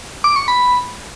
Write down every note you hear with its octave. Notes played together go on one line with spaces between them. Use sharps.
D6
C#6
B5